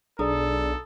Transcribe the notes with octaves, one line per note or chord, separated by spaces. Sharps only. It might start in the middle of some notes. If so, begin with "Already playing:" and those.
B1 D4 G#4 A4 D5 A#5 D#6